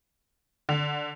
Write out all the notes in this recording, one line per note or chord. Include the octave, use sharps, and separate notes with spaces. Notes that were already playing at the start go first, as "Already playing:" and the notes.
D3